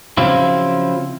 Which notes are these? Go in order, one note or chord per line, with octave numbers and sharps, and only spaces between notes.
C#3 F3 F#3 C4 E4 F4